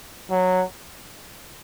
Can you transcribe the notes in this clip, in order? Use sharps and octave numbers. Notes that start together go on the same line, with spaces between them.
F#3